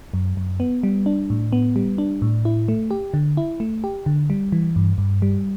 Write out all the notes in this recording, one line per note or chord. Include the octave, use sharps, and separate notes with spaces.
F#2
F#2
B3
G3
D4
A2
B3
G3
D4
A2
E4
A3
G4
D3
E4
A3
G4
D3
G3
E3
G2
G2
G3